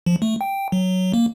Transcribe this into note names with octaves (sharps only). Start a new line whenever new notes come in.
F3
A3
G5
F#3
A#3